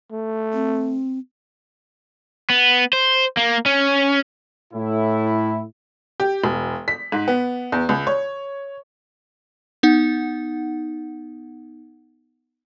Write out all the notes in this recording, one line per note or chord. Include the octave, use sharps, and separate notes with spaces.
A3
C4
B3
C5
A#3
C#4
A2 E4
G4
E1
B6
G#2
B3
E2
C#2
C#5
B3 D#4 F#5